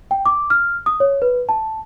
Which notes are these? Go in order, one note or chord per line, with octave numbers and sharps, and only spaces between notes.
G5
D6
F6
D#6
C#5
B4
A5